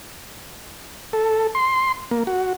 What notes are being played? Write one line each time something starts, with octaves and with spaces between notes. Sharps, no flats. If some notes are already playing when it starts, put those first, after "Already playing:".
A4
C6
A#3
F#4